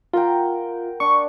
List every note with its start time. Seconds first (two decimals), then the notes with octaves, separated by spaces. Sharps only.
0.13 F4 A#4 F#5 G5
1.00 D4 C#6